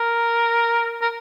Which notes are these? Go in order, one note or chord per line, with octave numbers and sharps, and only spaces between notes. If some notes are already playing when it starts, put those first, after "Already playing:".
Already playing: A#4
A#4